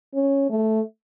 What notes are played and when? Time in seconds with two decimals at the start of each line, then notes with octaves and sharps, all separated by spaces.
0.14 C#4
0.50 A3